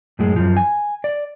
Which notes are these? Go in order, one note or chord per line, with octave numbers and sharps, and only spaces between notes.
F#2 A2 G#3
F#2 F3
G#5
D5